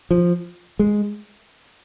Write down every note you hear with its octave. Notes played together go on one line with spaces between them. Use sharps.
F3
G#3